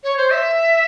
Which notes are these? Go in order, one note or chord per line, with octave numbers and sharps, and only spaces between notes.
C#5
C5
E5